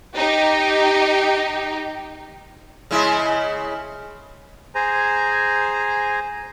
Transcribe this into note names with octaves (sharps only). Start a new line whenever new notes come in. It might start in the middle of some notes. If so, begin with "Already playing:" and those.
D#4 G4
C#3 G#3 E4
G#4 C5 G#5 A#5